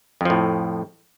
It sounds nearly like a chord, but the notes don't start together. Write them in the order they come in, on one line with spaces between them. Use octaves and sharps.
F2 F3 A2